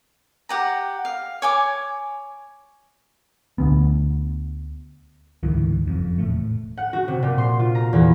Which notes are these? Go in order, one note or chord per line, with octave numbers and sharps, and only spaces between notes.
G4 F#5 A#5
F5
C#5 G#5 D6
D2 B3
D2 G#2 D#3 E3
F#1 F2
E1 A2 A3
F#5
F#4
C3
A#2
C6
F4
A#5
E2